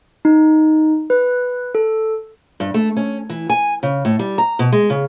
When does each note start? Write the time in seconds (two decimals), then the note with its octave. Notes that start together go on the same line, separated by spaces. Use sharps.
0.25 D#4
1.10 B4
1.75 A4
2.60 G2
2.74 A3
2.97 C#4
3.30 E3
3.49 G#5
3.83 C#3
4.05 A2
4.19 G3
4.38 A#5
4.59 B2
4.72 G#3
4.90 C#3